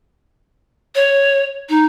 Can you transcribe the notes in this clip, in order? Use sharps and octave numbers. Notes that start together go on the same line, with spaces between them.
C#5
D#4